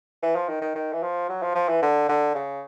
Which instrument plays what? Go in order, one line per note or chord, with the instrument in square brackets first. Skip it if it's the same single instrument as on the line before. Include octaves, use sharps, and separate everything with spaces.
[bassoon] E3
F3
D#3
D#3
D#3
E3
F3
F#3
F3
F3
E3
D3
D3
C#3